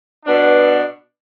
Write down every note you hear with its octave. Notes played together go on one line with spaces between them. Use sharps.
B2 B3 D4